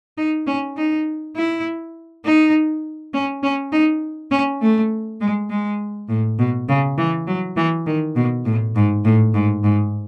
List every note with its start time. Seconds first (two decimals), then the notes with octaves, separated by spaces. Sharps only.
0.18 D#4
0.47 C#4
0.77 D#4
1.36 E4
2.25 D#4
3.13 C#4
3.43 C#4
3.72 D#4
4.31 C#4
4.62 A3
5.21 G#3
5.50 G#3
6.09 A2
6.39 B2
6.69 C#3
6.98 E3
7.28 F#3
7.56 E3
7.86 D#3
8.16 B2
8.46 A2
8.76 G#2
9.05 A2
9.34 G#2
9.64 G#2